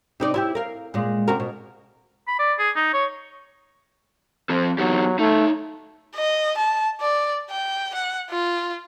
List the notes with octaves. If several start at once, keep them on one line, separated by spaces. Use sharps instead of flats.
C3 D#4 D5
E4 F4 G4
A#4 F5
A#2 G#3
C3 F#4 A#4
B2
B5
D5
G#4
D#4
C#5
F3 C4 A4
F#3 B3 D#4 G4
A3 D#4 C#5
D#5
A5
D5
G5
F#5
F4